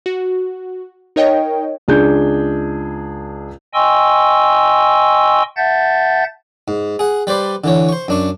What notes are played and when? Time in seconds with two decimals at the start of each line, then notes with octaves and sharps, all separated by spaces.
0.06 F#4
1.16 D#4 A#4 C#5 D#5 G5
1.88 C#2 D4 G#4 G6
3.74 D#5 G5 G#5 C6 C#6 E6
5.57 E5 F#5 A5 G6 A6
6.68 G#2
6.99 G#4 F#5
7.27 G3 B4 C5 D5
7.64 D3 E3 C#5
7.89 C5 C#6
8.08 F#2 D4 C#6